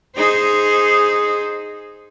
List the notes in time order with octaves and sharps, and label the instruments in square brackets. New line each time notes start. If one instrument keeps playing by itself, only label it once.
[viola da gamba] D#4 G#4 C5